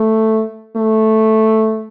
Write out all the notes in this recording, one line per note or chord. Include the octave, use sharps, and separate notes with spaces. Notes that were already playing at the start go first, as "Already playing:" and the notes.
Already playing: A3
A3